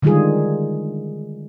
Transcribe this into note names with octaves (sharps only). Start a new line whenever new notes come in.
D3 D#3 G3 G#3 F4 G#4